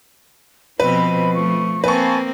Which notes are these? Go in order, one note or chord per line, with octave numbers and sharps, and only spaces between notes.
B2 F3 C4 B4 D#5 B5
A3 C#6
A#3 C4 B4 F5 G#5 A5 C#6